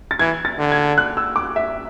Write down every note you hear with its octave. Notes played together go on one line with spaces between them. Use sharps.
A6
E3 G#6
A6
D3
G#6
F#6
E6
D6
E5